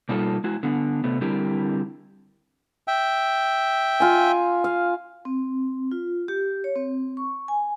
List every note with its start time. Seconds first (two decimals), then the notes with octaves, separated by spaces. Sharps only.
0.09 B2 G3 A#3 D#4 F4 A4
0.44 G#3 E4 F#4
0.63 D3 B3
1.04 C3 A3 B3
1.21 D3 G3 C4 E4 G4 A#4
2.88 E5 G5
4.00 F4 G#5
4.64 F5
5.25 C4
5.91 F4
6.28 G4
6.64 C#5
6.76 C4
7.17 C#6
7.48 G#5